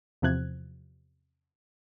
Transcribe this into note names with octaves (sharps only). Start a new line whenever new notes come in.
E2 C3 F3 F#6 G#6